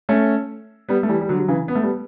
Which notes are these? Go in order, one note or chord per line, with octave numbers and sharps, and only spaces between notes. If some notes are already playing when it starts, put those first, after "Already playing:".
A3 C#4
G3 B3
A3
E3 G3
G3
D3 F#3
F#3
C#3 E3
B3
A3
G3 B3